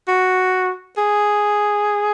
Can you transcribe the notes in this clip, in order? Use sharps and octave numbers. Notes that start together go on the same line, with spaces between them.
F#4
G#4